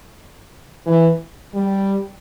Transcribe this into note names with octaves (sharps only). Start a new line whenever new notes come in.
E3
G3